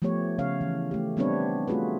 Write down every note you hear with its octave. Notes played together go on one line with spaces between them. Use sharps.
F3 A3 B3 G4 C#5
C#3 C#4 C#5 F5
E3
A3 G4
G3 B3 C4 D4 B4 C#5
A3 F4 F#4 G#4 B4